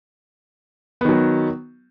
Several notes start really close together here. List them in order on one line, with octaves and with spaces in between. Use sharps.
B3 D#3 F#3